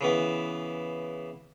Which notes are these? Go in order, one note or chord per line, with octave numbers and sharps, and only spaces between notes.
C#3 E3 B3